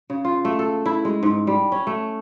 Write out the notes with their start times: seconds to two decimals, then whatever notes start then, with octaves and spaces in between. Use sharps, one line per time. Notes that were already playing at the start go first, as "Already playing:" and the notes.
0.10 C#3
0.25 F4
0.45 A3
0.59 A4
0.86 E4
1.05 G#3
1.23 G#2
1.47 G3
1.72 C#4
1.87 A3